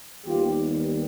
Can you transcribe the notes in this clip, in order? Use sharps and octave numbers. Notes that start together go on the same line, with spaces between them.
D#2 D#3 G3 B3 F4 G4